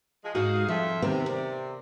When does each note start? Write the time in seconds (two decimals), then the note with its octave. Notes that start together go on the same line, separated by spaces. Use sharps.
0.23 F3 G#3
0.35 G#2 G#3 D#4 F#4 G#4 F5
0.68 F2 F3 F4 E5
1.02 C3 D#3 B3 C4
1.26 A#4 D5